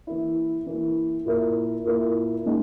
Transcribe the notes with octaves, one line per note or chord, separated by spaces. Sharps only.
E3 A#3 E4
E3 A#3 E4
A#2 A#3 E4 A#4
A#2 A#3 E4 A#4
C#3 G#3 D#4